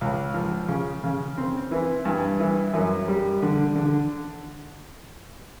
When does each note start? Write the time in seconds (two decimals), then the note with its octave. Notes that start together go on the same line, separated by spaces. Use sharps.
0.01 C#2
0.34 F3
0.68 C#3
1.04 C#3
1.38 C4
1.71 E3
2.05 G2
2.40 E3
2.74 F#2
3.08 G3
3.42 D3
3.75 D3